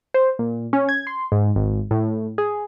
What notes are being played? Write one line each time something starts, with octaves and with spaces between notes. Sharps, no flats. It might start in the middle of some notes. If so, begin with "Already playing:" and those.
C5
A#2
C#4
G#6
C6
G#2
G#1
A2
G#4